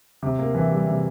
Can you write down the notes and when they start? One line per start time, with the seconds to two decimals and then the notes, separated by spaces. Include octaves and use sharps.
0.23 C3
0.39 A#3
0.55 E3
0.71 G3
0.88 C3